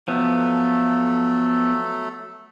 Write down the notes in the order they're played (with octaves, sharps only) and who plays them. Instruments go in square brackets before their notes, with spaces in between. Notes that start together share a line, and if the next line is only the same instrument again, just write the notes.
[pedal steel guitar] F3 B3 [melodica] F#3 A3 A4